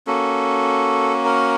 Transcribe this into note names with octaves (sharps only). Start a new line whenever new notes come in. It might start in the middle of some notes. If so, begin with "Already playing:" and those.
A#3 C#4 F#4 A4
A#4